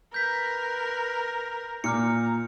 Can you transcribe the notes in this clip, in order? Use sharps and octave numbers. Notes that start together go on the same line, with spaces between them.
A#4 B4 G6 B6
A#2 A#5 D6 F6 C#7